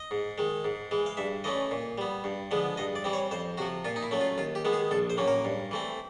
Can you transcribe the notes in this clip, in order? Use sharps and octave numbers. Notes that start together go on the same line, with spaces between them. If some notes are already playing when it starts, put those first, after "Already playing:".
Already playing: D#5
G#2
D#3 G#3
G#2
E3 G#3
F5
G2 E5
E3 A3 C#4 D#5
A#2
G3 B3
G2
D3 F3 G#3 B3
G2 D#5
D5
E3 G3 C4
C#5
F2 C5
C3 F3 F#4
A#2 F4
D#4
E4
F#3 A3 C#4
F4
D#2 F4
G4
D#3 G#3 B3
G#4
A#1 A4
C5
A2 F#3 A#3 C#4
A#4
G2
E3 A3 C4